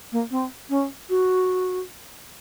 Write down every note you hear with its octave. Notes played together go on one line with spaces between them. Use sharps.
A#3
C4
C#4
F#4